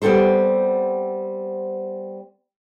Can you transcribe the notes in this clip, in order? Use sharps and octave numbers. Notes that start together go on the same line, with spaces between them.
G3 B3 C4 A4 C5